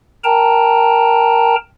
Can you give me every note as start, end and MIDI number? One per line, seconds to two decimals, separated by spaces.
0.24 1.55 70
0.24 1.55 79
0.24 1.55 81
0.24 1.55 82